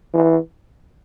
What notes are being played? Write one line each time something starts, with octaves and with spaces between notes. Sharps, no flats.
E3